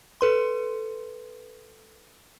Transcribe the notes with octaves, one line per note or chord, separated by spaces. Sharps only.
A4 B4 C6